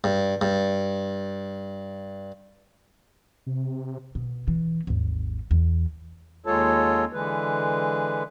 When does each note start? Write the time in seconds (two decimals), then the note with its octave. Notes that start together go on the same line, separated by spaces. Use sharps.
0.04 G2
0.41 G2
3.46 C3
4.15 B2
4.48 E3
4.87 G#1 D#2
5.51 E2
6.46 D#2 G#3 F4 A4 C#5 A5
7.13 D3 E3 G#3 B4